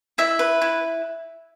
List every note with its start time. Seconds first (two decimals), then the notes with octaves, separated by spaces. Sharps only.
0.18 E4 E5
0.39 B4
0.61 E4